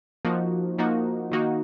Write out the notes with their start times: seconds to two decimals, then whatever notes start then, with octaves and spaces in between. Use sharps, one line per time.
0.25 F3 A#3 D#4 F#4
0.78 F3 A#3 D#4 F#4
1.31 D#3 A#3 D#4 F#4